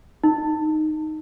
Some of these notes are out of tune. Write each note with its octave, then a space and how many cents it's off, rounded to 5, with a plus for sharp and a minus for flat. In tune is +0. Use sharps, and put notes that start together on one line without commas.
D#4 -5